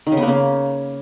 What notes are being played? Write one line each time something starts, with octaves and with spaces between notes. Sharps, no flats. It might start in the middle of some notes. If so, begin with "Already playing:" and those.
D#3
C#3
B3
A#3
C#3